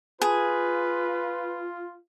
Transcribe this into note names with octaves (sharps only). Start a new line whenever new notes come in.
F4 G#4 B4